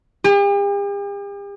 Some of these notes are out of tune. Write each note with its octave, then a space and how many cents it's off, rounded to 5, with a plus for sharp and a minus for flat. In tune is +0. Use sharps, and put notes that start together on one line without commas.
G4 +45